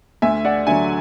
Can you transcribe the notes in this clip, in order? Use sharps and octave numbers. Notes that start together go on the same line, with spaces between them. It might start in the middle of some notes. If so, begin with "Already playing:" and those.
D2 E5 G#5
D5 F#5
D3 F#3 E5 G#5